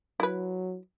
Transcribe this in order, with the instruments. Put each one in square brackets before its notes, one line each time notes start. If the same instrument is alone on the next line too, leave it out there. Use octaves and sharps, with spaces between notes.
[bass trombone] F#3 [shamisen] E4 B4